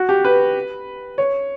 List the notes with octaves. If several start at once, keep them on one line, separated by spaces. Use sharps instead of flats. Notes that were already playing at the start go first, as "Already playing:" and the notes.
Already playing: F#4
G4
B4
C#5